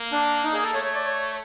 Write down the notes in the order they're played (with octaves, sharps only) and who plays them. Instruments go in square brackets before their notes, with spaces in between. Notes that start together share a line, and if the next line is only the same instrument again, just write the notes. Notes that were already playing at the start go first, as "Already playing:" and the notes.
Already playing: [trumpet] A#3
[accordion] D4
D#4
G#4
A4
[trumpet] A3 [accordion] C#5
[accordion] C#5
D5
C#5